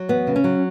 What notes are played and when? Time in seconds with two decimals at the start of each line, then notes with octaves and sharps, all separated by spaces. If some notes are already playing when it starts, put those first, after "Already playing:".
Already playing: F#3
0.09 E2 B3
0.27 C#3
0.36 C#4
0.44 F#3